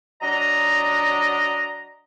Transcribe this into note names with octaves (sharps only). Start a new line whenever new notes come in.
F#3 D4 D#5 A#5